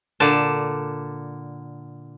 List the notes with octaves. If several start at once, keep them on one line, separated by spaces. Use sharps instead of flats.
A#2 D3 A5